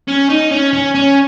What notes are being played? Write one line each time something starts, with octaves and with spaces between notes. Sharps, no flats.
C#4
D#4
C#4
C#4
C#4